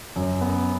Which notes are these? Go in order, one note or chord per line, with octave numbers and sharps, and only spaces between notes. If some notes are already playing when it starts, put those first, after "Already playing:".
F#2
B3